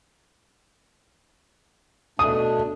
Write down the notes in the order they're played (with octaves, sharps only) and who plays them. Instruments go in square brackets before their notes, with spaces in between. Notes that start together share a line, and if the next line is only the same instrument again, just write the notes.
[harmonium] B2 A3 D4 [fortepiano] D#6